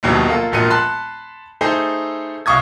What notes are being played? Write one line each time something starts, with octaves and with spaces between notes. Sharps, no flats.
A#1 D#2 B2 F#3 G3
A#3 F4 A4
E1 A#1 A#2 A#4 C#7 D#7
A5 B5 C6 F#6
A3 D#4 G#4 A4 C5
C2 F5 C#6 D#6 G#6